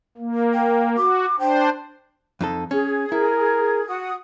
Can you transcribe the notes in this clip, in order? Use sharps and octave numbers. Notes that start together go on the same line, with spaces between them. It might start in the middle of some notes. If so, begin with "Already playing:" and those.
A#3
G5
F#4 D6
D4 C5 G5
F2 D#4 A4
C#4 G#4
E4 A#4
F#4 F#5 D#6